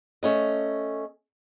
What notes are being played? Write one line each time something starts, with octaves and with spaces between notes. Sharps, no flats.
A3 C#4 D#5